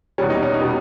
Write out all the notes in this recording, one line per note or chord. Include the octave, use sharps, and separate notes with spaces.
E2 B2 G3 C#4
D#4
C#4
D#4
B2 G3